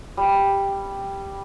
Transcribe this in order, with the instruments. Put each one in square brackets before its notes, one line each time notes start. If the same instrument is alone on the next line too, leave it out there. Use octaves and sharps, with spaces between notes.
[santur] G3